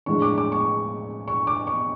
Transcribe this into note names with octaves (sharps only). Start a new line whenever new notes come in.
A2 F3 G#3 D4 C#6
D6
D6
C#6
C#6
D6
C#6